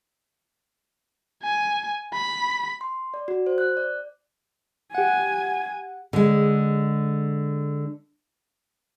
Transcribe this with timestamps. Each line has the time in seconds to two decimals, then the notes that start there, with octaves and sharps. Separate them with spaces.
1.43 G#5
2.13 B5
2.81 C6
3.14 D5
3.28 F#4
3.47 C5
3.58 F#6
3.77 D5
4.94 G4 F#5 G#5
6.13 D3 G#3